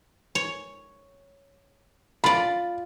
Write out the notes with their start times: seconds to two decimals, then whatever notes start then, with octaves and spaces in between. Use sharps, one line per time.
0.35 C#5
2.24 F4 D5 B5